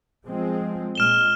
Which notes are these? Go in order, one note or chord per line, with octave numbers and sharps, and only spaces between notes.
F3 G#3 C4
A#2 G#3 F6 E7 G7